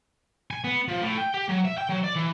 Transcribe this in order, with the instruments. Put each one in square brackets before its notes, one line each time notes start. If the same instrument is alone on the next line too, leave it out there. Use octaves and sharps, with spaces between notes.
[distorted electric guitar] G#5
B3
F3
A2
G5
G4
F#3
E5
G5
F#3
D5
E3